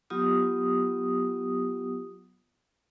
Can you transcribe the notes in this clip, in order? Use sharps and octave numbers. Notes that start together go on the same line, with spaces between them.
F#3 B3 F4 G4 D#6